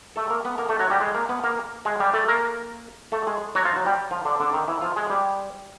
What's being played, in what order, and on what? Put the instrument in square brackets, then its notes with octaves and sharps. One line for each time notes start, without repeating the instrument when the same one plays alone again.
[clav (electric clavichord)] A3 A4
A#3 A#4
B3 B4
A#3 A#4
A3 A4
F#3 F#4
G3 G4
G#3 G#4
A#3 A#4
B3 B4
A#3 A#4
G#3 G#4
G3 G4
A3 A4
A#3 A#4
A3 A4
G#3 G#4
F#3 F#4
F3 F4
F#3 F#4
G3 G4
F3 F4
D3 D4
D3 D4
D#3 D#4
E3 E4
F3 F4
G#3 G#4
G3 G4